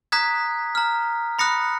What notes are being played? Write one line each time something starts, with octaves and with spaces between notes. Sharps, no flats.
A#5 D#6 F#6 G#6 B6
A#5 F6
B5 D#6 F#6 A#6 C#7